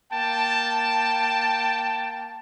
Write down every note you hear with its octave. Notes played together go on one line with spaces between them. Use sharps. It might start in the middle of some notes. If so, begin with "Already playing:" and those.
A#3 G5 A5